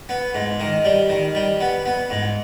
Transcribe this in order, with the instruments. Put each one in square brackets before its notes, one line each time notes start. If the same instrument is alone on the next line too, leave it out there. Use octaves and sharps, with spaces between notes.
[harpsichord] B3
G#2
D#3
G3
D#3
G3
B3
B3
G#2